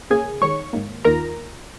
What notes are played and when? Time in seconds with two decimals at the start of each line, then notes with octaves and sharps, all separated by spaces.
0.10 C#2 C#3 A#3 C#4 G#4 G#5
0.41 D#2 D#3 G#3 C#5 C#6
0.73 G#1 G#2 D#3 A#3
1.05 D#2 D#3 A#3 F4 A#4 A#5